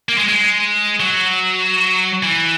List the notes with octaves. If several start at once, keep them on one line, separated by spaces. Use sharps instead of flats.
A#3
G#3
G#3
F#3
E3